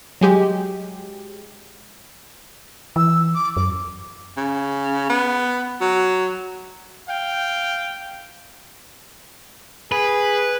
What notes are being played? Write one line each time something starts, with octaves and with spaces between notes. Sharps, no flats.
F#3 G#3 G4
E3 E6
D6
F#2 D6
C#3
B3
F#3
F5 G5
G#4 B4